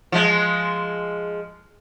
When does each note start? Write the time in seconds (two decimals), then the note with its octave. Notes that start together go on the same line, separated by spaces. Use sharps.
0.12 F3 G#3